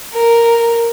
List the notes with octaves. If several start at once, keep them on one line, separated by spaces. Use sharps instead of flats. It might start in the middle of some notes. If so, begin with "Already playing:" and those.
A#4